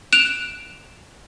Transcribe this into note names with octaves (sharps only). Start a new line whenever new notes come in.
F#6 D7 E7 F7